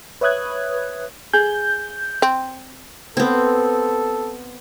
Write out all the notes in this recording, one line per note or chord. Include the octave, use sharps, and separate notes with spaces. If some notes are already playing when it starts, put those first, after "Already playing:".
B4 C#5 E5 D#6 F#6 G#6
G#4 G6
C4
B3 C4 A4